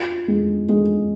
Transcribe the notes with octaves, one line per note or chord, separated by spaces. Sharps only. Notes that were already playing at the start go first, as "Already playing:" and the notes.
Already playing: F4
G#3
G#3